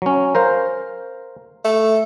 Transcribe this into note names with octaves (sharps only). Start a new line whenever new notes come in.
F#3 C#4
A#4 C5 F5
A3